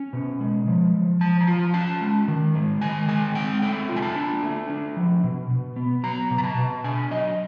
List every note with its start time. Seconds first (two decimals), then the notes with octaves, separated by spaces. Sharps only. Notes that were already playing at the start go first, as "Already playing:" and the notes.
Already playing: C#4
0.13 B2
0.41 G#3
0.67 F3
0.94 F3
1.21 F3 A5
1.41 A#5
1.47 F4 A5
1.74 C#4 A5
2.01 G#3
2.28 D#3
2.55 G#3
2.82 D#3 G#5
3.08 G#3 G#5
3.35 C4 G5
3.62 A3 G5
3.89 F4
3.96 G#5
4.02 A5
4.16 D4
4.43 A3
4.70 D4
4.97 F3
5.24 B2
5.51 B2
5.76 B3
6.03 F#3 A#5
6.31 B2
6.38 A#5
6.44 A5
6.58 B2
6.84 D4 G#5
7.11 F#3 D#5